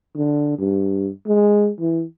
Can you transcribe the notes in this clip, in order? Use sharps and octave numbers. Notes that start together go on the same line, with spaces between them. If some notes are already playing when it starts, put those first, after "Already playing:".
D3
G2
G#3
E3